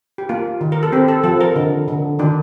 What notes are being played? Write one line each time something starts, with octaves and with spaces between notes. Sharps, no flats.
G4
A#3 F4
D#3
A#4
A4
C4 G4
A4
F3 A4
A#4
D3
D3
D#3 D4